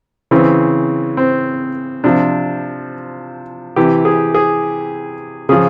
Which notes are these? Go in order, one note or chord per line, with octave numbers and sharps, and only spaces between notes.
C#3 E3 C4
C4
C3 F3 D4
C3 E3 G4
G#4
G#4
C#3 F3 G#4